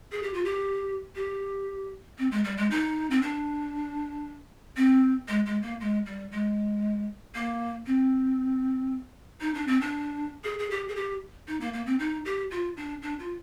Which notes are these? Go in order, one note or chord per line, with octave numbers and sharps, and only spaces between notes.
G#4
G4
F4
G4
G4
C4
G#3
G3
G#3
D#4
C4
D4
C4
G#3
G#3
A#3
G#3
G3
G#3
A#3
C4
D#4
D4
C4
D4
G#4
G#4
G4
G#4
G4
D#4
A#3
A#3
C4
D#4
G4
F4
D4
D4
F4